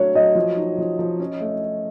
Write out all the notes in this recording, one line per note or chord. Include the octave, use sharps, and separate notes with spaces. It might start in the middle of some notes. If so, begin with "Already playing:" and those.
Already playing: F#3 A3 D4 C#5
F#3 D#5
F3
D#4
F3
F3
C#4
A3